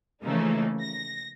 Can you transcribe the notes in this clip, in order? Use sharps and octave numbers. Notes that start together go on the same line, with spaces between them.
C#3 E3 F3 A3 A#3 D#4
A#6